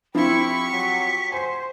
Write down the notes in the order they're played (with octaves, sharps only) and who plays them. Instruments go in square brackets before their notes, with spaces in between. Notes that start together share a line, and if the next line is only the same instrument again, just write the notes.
[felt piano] F3 C4 [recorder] E4 [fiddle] G4 C#6 [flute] B5
[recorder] F#3 [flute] B6
[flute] C5 [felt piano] G#5 C6